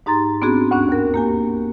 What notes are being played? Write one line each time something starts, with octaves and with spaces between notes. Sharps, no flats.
G#2 D#4 G4 A#5 C6 A6
B3 C4 D4 F#4 G#4
D2 G2 C#4 D4 F#6
D#2 A#4
A#3 G4 G#5